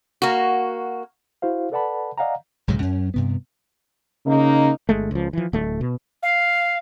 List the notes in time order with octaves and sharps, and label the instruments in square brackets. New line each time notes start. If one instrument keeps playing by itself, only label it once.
[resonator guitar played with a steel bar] A#3 F#4
[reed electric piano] E4 F#4 C5 F5
A4 B4 D5 F#5 A5 B5
D5 D#5 F5 F#5 G#5 A#5
[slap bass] B1 G#2 C#3 F#3
F#2 C#4
G2 C3 B3
[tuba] C#3 [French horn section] A#3 D#4
[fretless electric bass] G1 G#3 A3
C#2 F3
E3 F3
D1 A3
B2
[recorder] F5